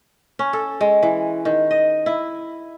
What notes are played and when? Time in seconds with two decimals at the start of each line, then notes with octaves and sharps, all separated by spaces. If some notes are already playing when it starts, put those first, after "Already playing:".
0.39 C#4
0.53 A4
0.81 G#3
1.03 E3
1.45 D#3
1.71 D#5
2.06 E4